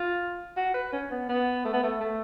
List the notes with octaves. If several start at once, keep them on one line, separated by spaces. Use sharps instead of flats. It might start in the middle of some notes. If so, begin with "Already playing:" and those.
Already playing: F4
F#4
B4
C#4
B3
B3
A3
B3
A3
A3